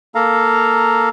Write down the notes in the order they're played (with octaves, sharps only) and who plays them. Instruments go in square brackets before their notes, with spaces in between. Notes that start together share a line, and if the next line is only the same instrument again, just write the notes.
[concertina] A#3 A4 F5 A#5